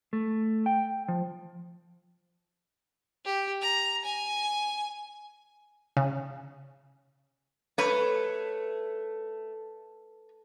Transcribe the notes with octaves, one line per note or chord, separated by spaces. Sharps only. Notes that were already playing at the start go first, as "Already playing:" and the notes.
A3
G5
F3
G4
A#5
G#5
C#3
A3 B4 C#5